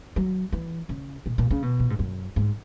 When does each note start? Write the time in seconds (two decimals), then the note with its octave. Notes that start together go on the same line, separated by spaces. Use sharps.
0.16 F#3
0.52 E3
0.89 C#3
1.26 A#2
1.38 A#2
1.51 C#3
1.62 B2
1.80 A#2
1.90 G#2
1.99 F#2
2.36 G#2